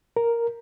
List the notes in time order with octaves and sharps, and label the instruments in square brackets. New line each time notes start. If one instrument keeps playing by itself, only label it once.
[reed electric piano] A#4